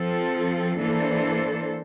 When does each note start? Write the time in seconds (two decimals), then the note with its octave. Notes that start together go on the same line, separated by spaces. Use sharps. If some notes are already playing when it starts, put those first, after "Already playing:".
Already playing: F3 C4 F4 A4
0.77 E3 A#3 D4 A4 C5